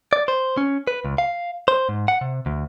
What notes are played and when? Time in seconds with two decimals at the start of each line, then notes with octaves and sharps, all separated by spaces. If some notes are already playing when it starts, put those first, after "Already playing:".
0.13 D5
0.28 C5
0.57 C#4
0.87 B4
1.05 C#2
1.18 F5
1.68 C5
1.89 G#2
2.08 F#5
2.21 C3
2.46 D2